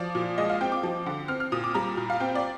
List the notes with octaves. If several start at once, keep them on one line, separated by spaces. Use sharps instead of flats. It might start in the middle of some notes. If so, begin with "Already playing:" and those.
Already playing: F3 D5
A#2
G#3 D#5
F5
C4 G5
D6
F3
D3
C4 F6
F6
A#2 D#6
D6
G3 A#5
A#2
F5
C4 G5
D5